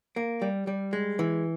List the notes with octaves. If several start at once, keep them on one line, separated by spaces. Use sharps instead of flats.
A#3
G3
G3
G#3
E3